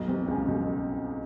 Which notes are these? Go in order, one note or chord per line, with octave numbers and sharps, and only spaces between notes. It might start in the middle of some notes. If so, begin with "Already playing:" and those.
Already playing: B1 B2
C2 C3
C#2 C#3
B1 B2